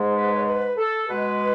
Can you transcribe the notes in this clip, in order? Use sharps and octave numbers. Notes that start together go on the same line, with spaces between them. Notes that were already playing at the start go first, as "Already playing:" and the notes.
Already playing: G#2 G#3
B4
C#5
B4
A4
B2 G#3 B4